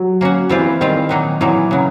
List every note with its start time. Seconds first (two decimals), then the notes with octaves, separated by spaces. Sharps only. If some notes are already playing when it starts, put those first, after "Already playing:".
Already playing: F#3
0.21 A#3 C#4 F#4
0.49 E3 G3 C4 F4
0.81 D#3 G3 C4 F4
1.09 A#2 F#3 A#3 D#4
1.41 A#2 E3 F#3 A#3 D#4
1.71 C#3 F#3